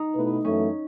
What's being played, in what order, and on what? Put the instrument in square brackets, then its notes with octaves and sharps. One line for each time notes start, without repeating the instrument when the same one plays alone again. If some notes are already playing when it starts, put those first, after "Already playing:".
Already playing: [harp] D#4
[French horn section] B2 A3 E4 B4
[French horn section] F#2 E3 A3 [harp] C#4